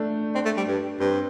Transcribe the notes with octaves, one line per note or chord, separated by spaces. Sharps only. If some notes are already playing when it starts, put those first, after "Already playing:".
Already playing: A3 D4
C4 D4
A3
G3
G2
G2 C4